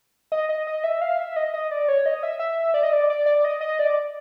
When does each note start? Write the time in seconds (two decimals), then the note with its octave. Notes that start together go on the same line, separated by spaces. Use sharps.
0.32 D#5
0.49 D#5
0.67 D#5
0.84 E5
1.02 F5
1.18 E5
1.36 D#5
1.54 D#5
1.71 D5
1.88 C#5
2.06 D#5
2.23 E5
2.39 E5
2.74 D5
2.83 D#5
2.93 D5
3.10 D5
3.26 D5
3.45 D#5
3.61 D#5
3.79 D5